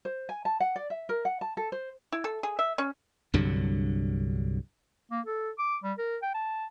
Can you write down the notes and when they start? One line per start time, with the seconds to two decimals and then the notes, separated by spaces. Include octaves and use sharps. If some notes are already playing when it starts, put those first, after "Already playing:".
0.05 C5
0.29 G#5
0.45 A5
0.60 F#5
0.76 D5
0.90 E5
1.09 A#4
1.25 F#5
1.41 A5
1.57 A4
1.72 C5
2.12 E4
2.24 A4
2.43 G#4
2.59 E5
2.78 C#4
3.34 C2 G2 D3 F#3
5.11 A#3
5.26 A4
5.59 D6
5.83 G3
5.98 A#4
6.22 G5
6.34 A5